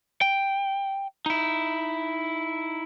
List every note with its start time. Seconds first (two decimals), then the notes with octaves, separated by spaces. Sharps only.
0.21 G5
1.26 D#4 E4